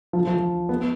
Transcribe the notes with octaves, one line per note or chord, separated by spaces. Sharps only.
F3
F3
B3